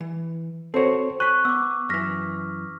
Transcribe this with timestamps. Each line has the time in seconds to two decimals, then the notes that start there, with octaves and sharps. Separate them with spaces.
0.01 E3
0.74 C4 F#4 A4 C5 C#5
1.20 G#5 B5 C#6 F#6
1.45 B3 D6 E6
1.89 F#2 E3 F6 A#6 B6